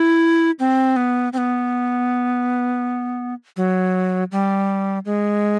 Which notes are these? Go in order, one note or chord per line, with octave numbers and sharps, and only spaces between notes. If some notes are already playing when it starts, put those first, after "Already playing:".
Already playing: E4
C4
B3
C4
B3
F#3
G3
G#3